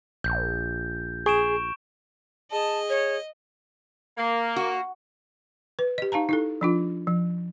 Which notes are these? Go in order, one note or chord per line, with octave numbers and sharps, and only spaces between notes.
A#1 G6
G#4 C#6 D7 E7
G#4 D#5 A5
C#5
A#3
F#4
B4
G4 D#5
D#4 F5 A5 A#5
D#4 E4 A4
F3 D4 F4
F3